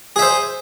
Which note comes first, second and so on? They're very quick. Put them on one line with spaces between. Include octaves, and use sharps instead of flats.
G#4 E5 C5